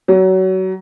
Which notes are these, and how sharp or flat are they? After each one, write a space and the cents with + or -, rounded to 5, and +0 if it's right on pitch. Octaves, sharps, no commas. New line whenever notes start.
F#3 +25